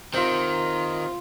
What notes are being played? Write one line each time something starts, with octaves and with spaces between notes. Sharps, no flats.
C3 D#3 F4